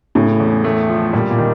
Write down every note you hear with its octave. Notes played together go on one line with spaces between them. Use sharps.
A2 C#3
E2
A3
F3
A#2 G3
A#2
D#3